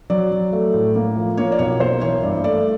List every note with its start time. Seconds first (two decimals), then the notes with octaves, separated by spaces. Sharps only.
0.10 F#3 D5
0.31 F#3
0.52 A3
0.74 A2
0.95 A#3
1.16 F3
1.37 A#3 C#5
1.52 D5
1.59 B1 C#5
1.80 A#3 C5
2.01 E3 C#5
2.23 G2 D5
2.44 A3 D5